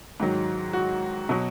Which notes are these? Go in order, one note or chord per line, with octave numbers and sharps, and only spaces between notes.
G#2 D#3 F#3
F#4
B2 F#3